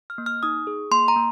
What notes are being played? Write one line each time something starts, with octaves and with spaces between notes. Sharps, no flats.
F6
A#3
F6
D#4 D#6
G#4
A#3 C6
A#5
A#3